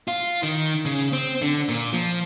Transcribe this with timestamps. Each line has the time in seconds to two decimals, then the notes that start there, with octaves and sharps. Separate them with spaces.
0.08 F4
0.43 D#3
0.85 C#3
1.13 C4
1.42 D3
1.69 A#2
1.93 F3